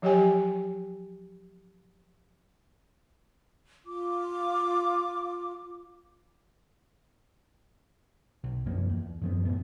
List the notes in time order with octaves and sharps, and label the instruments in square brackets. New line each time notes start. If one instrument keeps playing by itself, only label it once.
[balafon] F3 F#3 G4 C#5 G5 G#5
[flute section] F4 D6
[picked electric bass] B1
F#2 F3 A#3
E2
F#2 F3 B3
F#1 E2 A2 B3